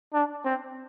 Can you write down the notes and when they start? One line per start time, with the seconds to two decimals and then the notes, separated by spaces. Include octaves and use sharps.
0.14 D4
0.45 C4